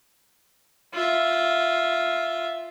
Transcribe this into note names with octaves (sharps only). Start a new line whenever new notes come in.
F4 E5